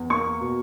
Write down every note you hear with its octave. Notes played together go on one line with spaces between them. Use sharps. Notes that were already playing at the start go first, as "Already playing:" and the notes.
Already playing: E2
A#3 C#6
B2